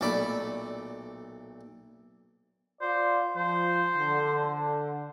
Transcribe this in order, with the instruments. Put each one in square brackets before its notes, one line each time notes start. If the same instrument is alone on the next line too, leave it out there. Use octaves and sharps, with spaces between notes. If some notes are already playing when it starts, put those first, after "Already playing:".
[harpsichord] B1 A#2 A3 D5 B5
[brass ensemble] F4 D5 [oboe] C5
[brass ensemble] F3 [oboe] C5
[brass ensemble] D3